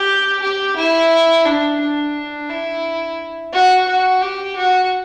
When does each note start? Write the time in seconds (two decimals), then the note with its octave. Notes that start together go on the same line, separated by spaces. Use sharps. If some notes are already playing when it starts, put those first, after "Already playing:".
Already playing: G4
0.42 G4
0.76 E4
1.45 D4
1.80 D4
2.50 E4
3.53 F#4
3.87 F#4
4.22 G4
4.56 F#4